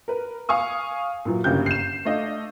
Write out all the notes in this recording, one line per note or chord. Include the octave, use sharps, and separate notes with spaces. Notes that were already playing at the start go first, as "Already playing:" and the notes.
A#4 B4
F5 G#5 C#6 D#6
A#2 E3 F#3
G1 C#3 A#3 G4 G6
C7 E7
A3 D4 D#5 F5